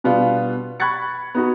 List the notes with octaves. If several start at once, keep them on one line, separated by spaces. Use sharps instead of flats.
B2 G3 B3 D4 F4
B5 C#6 F#6 G#6 A6 C#7
B3 D#4 F#4